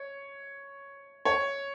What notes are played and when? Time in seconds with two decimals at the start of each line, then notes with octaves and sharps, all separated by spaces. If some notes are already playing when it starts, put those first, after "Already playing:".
Already playing: C#5
1.25 C#5